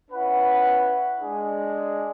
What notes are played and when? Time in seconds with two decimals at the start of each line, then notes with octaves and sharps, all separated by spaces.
0.11 C#4 E4 B4 F#5
1.20 G#3 D4 G#4